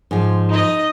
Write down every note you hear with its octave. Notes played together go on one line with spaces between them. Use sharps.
G#2 F3
D#4 D#5